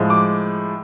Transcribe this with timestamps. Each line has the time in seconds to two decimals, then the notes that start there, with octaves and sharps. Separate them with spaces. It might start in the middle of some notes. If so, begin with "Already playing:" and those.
Already playing: A2 F3 G#3
0.10 D6